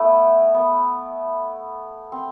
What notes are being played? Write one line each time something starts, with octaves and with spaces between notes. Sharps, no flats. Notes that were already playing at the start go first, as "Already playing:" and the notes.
Already playing: A3 B3 E4
B3
C4